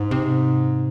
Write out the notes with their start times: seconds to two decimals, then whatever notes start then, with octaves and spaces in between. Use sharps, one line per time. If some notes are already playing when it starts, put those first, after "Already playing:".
Already playing: G#2
0.11 C3